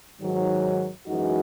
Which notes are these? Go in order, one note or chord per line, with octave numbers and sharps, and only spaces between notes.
G#2 D#3 F#3
F#2 E3 G#3 D#4 F#4